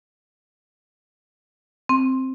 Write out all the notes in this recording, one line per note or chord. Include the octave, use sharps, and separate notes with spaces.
C4